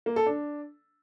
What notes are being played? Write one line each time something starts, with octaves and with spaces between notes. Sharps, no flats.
A#3
A4
D4